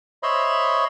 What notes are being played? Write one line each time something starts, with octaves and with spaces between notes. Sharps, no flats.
C5 C#5 D#5 E5 B5 C6